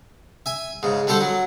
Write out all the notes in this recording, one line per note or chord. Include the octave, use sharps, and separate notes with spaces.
E5 G#5
G#2 C#3
D3 G3 G4 A4 C5
F#3